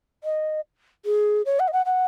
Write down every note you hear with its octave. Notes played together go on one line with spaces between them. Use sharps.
D#5
G#4
C#5
F#5
D#5
F#5
F#5